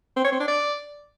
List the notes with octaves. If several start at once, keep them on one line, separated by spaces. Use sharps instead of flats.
C4
C#5
C4
D4
D5